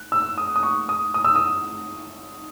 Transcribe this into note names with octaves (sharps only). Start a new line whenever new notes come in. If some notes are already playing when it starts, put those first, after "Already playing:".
Already playing: F#6
E6
D#6
D#6
C#6
D#6
D#6
E6
D#6